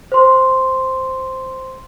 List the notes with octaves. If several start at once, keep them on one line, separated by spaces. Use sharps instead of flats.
C5 C6